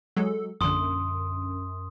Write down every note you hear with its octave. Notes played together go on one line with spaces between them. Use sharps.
F#3 G#3 A4
A#1 F#2 D3 C6 D#6